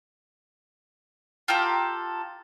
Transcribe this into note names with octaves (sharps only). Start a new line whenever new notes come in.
F4 G4 A4 A#5